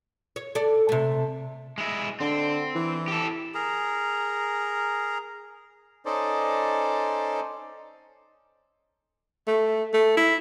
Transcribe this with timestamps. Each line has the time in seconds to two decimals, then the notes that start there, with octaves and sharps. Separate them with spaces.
0.36 C#5
0.55 A4 D5
0.89 C3 A3
1.78 G#3 E4
2.20 D3 C4
2.75 E3
3.08 G4 A4
3.54 G#4 A#4 A#5
6.06 C#4 D#4 A4 C5 D5 D#5
9.48 A3
9.94 A3
10.17 E4